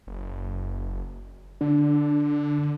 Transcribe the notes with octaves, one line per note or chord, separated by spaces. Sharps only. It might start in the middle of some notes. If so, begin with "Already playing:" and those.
F#1
D3 D4